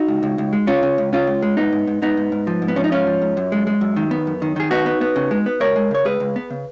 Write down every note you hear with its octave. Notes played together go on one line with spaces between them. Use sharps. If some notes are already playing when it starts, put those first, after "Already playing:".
Already playing: D#4 F#4
C#2
C#2
C#2
G#3
C#3 C#4 F4
C#3
C#2
C#3 C#4 F4
C#2
G#3
G#2 B3 D#4
G#2
G#2
G#2 B3 D#4
G#2
G#2
F3
G#2
B3
F3 C#4
D#4
G#2 C#4 F4
F3
G#2
F#2
G#3
G#3
F#2
D#3
B3
F#2
D#3
D#3 G#4
B3 D#4 F#4
B3
B3
C#3
G#3
B3
C#2 A#4 C#5
G#3
C#3 C#5
C#2 G#4 B4
C#2
B3
C#3